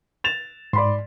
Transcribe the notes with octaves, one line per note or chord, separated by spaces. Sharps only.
A6 E7 F7
G#2 D5 B5 C6